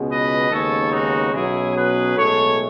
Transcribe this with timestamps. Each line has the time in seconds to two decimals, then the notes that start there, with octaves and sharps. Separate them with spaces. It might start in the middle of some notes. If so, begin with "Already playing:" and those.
Already playing: C#2 B2 G#3 B3
0.10 B4 D#5
0.51 D#2 C#3 G#3 B3 A4 C#5
0.92 D#4 F#4
1.34 B1 B2 F#3 C#4 E4 G#4
1.75 G#4 B4
2.17 B1 A2 G#3 A4 C#5